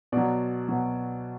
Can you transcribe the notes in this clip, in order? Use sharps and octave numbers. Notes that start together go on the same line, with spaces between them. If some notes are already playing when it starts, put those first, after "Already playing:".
B2 F#3 D5
B2 F#3